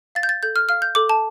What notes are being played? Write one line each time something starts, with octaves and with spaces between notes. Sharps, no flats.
F5 A6
G6
A6
A4 G6
F6
F5 F6
G6
A4 D6
A5